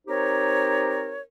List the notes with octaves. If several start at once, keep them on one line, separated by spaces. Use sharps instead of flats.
C4 D#4 G4 A#4 C5 C#5